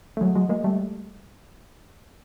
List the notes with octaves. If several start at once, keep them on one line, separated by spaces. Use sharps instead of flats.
A3
F#3 G#3
F#3 G#3
G#3 A#3
G3 A3